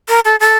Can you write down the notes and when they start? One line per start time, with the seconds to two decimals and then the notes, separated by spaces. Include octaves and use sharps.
0.09 A#4
0.25 A4
0.40 A4